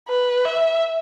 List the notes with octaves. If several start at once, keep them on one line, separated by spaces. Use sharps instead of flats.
B4
E5